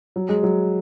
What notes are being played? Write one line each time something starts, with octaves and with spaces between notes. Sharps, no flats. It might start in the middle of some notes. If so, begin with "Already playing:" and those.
F#3
G#3
F#3